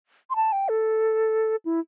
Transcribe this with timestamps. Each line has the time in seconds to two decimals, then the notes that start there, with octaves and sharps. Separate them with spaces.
0.30 C6
0.36 A5
0.52 G5
0.69 A4
1.65 E4